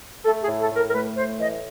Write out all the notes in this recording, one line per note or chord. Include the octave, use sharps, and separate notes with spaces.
A3 A4
G#4
A2
A4
A2
A#4
A#4
A3 B4
A2 C5
E3 D#5